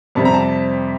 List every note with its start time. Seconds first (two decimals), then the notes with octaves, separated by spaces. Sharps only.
0.15 F2 C3 G3 C4 A5
0.25 A#5
0.34 A5